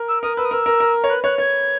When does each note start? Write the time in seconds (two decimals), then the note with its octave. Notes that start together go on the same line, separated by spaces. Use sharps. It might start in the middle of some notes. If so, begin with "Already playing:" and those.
Already playing: A#4
0.09 E6
0.23 A#4 D#6
0.37 B4 E6
0.45 D#6
0.51 A#4 E6
0.66 A#4
0.80 A#4
1.04 C#5
1.10 B4 F#6
1.24 C#5 F#6
1.38 C#5 G#6